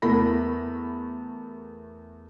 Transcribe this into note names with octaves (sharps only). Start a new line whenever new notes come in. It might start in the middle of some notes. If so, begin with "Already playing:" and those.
E2 A3 A#4 B5 A#6